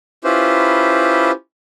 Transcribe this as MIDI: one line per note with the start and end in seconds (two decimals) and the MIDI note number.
0.24 1.31 61
0.24 1.31 64
0.24 1.31 65
0.24 1.31 67
0.24 1.31 71
0.24 1.31 72